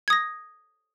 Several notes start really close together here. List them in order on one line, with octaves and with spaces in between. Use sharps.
G#6 D#6 A#6